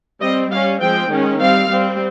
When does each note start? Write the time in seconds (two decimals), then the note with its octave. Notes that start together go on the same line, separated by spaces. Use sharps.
0.21 G3 C4 D#5
0.50 G3 C#4 F5
0.81 F3 G#3 C4 G5
1.10 D#3 G#3 C#4
1.40 G3 C4 F5
1.70 G3 C4